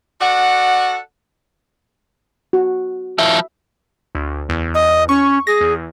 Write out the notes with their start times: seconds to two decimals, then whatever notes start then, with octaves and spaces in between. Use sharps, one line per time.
0.21 F#4 A4 D5 F#5
2.53 F#4
3.18 F3 E4 E5
4.15 D2
4.49 E2
4.75 D#5
5.09 C#4 C#6
5.47 G#4 A#6
5.61 E2